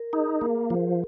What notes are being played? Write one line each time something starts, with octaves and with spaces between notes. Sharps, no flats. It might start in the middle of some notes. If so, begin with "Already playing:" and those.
Already playing: A#4
D#4 G#4
A#3
F3